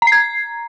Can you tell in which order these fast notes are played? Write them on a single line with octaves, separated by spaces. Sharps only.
A#5 C7 G#6